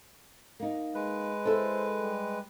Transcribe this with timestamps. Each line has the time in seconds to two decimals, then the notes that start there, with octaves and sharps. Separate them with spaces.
0.60 A#3 D#4
0.95 G#3 B4
1.45 E4 A4 C5
2.00 G3